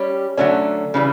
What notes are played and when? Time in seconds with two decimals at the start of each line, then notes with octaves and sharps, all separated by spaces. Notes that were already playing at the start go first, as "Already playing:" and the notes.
Already playing: G3 C#4 G4 C#5
0.38 D3 F#3 A3 C#4 D5
0.94 C#3 E3 G3